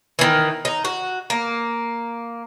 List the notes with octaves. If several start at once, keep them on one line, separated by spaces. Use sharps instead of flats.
D#3 E3
D#4
F#4
A#3